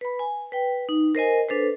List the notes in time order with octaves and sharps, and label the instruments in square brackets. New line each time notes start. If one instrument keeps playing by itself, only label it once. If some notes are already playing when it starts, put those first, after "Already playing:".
[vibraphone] B4 B5
G#5
B4 G5
D#4
A#4 C5 D#5 G#5
D4 A4 B4 C5